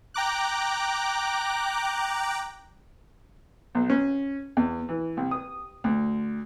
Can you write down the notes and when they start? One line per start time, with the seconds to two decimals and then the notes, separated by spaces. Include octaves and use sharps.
0.14 G5 A#5 D6 F#6
3.75 B1
3.90 C#4
4.57 E2
4.89 E3
5.17 C2
5.31 D#6
5.84 D2